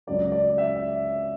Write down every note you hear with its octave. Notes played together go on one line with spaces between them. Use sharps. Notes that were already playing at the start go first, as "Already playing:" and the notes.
C#2 C#3 F#3 D5
D5
E5